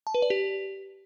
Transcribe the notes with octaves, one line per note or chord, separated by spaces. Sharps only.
A5
B4
D5
G4